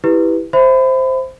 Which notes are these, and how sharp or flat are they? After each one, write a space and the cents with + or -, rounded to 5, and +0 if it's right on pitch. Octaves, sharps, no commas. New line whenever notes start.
E4 +0 G4 +10 B4 +0
C5 +0 E5 +0 B5 +30